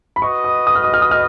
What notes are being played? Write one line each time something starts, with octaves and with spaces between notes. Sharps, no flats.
B5
F#4 B4 D#5 C#6
D#6
D#6
F6
D#6
F6
D#6
F6